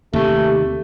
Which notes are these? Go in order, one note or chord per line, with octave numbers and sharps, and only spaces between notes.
D#2 C3 D#3 A3 G4